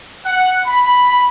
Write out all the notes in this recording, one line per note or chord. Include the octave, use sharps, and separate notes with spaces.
F#5
B5